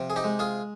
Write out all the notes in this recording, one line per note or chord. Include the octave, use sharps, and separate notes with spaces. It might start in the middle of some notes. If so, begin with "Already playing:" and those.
Already playing: C3 F3
G#4
D#4 G4
G#3
F4 G#4